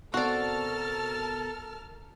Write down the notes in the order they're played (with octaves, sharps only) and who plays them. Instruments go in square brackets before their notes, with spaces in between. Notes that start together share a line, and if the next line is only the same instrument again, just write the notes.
[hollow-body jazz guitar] B2 C4 [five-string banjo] F#4 D5 [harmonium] A4 [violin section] A#4 A5 F6